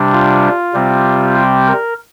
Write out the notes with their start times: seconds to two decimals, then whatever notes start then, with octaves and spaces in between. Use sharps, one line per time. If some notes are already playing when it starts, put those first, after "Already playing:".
Already playing: C3 G3 D4
0.12 F4
0.73 C3 G3 C4
1.35 G4
1.67 A#4